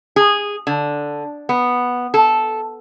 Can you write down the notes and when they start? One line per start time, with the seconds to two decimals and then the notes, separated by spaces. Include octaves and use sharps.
0.16 G#4
0.67 D3
1.49 B3
2.14 A4